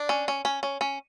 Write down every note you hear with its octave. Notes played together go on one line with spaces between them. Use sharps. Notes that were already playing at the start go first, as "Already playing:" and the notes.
Already playing: D4
C#4
C#4
C#4
C#4
C#4